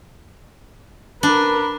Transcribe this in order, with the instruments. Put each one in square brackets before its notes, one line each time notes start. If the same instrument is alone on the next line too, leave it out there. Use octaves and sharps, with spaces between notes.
[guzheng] D4 [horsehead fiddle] A#4 B4